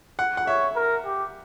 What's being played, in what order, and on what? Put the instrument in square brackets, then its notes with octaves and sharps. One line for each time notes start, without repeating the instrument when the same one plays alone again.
[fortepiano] F#5
F#5
[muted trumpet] C#5 [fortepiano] E5
[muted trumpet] A#4
G4